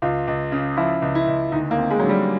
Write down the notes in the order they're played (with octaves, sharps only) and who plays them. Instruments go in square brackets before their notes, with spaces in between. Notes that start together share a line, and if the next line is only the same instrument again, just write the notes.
[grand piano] C#2 [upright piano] F4
[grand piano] C#2
C#3
[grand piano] F3 [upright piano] E4
[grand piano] C#2
[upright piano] E4
[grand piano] C#2
[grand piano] D2 [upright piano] D#4
[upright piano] A#3
[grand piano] C4
[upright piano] G#3
[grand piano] D3 [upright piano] F#3
[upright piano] G3